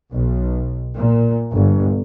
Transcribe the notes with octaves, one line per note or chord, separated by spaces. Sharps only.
B1
A#2
G1